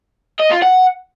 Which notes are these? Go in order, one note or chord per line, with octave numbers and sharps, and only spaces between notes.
D#5
F4
F#5